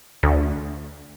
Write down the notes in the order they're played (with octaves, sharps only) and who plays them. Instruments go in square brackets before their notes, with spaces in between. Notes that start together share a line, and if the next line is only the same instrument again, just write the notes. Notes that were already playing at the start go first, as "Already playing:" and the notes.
[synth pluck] D2